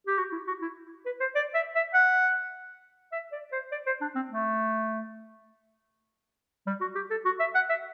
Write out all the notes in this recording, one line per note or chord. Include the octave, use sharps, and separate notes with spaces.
G4
F#4
E4
F#4
E4
B4
C5
D5
E5
E5
F#5
E5
D5
C5
D5
C5
D4
C4
A3
G3
F#4
G4
A4
F#4
E5
F#5
E5